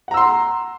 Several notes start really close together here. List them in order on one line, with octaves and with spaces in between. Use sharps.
F#5 A#5 E6 C6